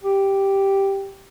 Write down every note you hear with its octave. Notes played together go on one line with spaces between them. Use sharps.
G4